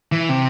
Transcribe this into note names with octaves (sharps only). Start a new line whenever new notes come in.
E3
C3